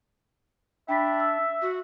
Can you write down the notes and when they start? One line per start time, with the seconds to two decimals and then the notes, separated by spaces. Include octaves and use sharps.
0.89 D4 E5 G5 B5 B6
1.20 E6
1.62 F#4